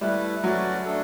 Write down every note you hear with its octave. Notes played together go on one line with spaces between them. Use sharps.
G3 A3 E4 B4
F#3 A3 C#4 F#4 B4 D5
A3 D4 A4